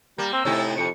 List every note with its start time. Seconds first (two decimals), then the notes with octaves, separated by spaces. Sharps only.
0.18 G3 A#3 A#5
0.33 C4 E6
0.45 A2 C3 D#4 E4
0.77 F2 C#7